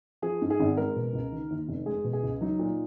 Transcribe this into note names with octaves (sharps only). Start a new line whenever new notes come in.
F3 G#4
G#2
G#4
G#1
G#3 A#4
B2
C#2
D#3
D#2
F1
G#3 G#4
B2
G#4
C#2
F#3 D#4
A#2